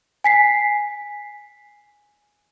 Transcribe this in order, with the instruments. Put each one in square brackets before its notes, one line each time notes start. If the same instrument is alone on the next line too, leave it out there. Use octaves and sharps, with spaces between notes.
[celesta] G#5 B6 C7